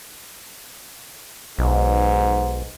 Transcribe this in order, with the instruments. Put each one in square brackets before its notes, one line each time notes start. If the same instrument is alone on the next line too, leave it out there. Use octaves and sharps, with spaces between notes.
[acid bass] B1 [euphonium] G#2